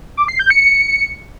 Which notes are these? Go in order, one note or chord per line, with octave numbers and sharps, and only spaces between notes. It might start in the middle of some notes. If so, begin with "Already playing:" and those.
D6
C7
G6
C#7
C#7